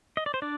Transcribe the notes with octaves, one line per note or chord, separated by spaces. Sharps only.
D#5
D5
C5
D4 D5